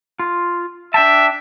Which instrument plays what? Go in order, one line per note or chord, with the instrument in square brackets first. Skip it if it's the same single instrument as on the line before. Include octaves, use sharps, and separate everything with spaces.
[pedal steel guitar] F4
[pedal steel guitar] D4 G5 A5 [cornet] E5